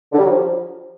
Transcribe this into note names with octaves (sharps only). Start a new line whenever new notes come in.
D3
G3
F#3
F3